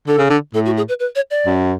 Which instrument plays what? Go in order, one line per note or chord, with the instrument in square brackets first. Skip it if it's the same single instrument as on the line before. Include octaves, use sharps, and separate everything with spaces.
[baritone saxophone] D3 [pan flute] A4
[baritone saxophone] C#3
D3
[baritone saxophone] A2 [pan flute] A4
[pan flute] F#4
G#4
B4
B4
C#5
D5
[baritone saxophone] F#2